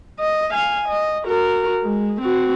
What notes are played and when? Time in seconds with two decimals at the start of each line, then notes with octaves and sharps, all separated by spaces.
0.20 D#5
0.51 F5 G#5
0.88 D#5
1.25 F#4 A#4
1.83 G#3
2.21 C4 F#4